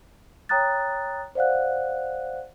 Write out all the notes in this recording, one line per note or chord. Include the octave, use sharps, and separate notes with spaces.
C#5 G5 A#5 D#6 F#6 A6
C5 D5 F5 F#5 F#6